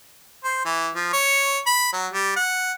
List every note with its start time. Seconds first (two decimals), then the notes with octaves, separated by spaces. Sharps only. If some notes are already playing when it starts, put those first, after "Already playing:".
0.44 C5
0.65 E3
0.95 F3
1.13 C#5
1.66 B5
1.93 F#3
2.12 G3
2.36 F#5